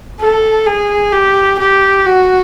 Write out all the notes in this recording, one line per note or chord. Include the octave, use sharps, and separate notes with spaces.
A4
G#4
G4
G4
F#4